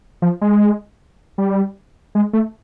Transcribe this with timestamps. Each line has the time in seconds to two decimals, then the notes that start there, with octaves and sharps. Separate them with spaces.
0.22 F3
0.41 G#3
1.38 G3
2.15 G#3
2.33 A3